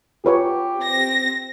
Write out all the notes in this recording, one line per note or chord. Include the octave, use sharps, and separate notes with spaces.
F4 G4 B4 C#5
C4 A#6